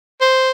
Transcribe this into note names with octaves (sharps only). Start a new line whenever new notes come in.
C5